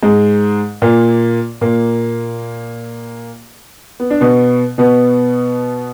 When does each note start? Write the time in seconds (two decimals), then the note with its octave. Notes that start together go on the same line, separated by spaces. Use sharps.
0.03 G#2 G#3
0.82 A#2 A#3
1.61 A#2 A#3
4.00 B3
4.11 D4
4.21 B2 B3
4.78 B2 B3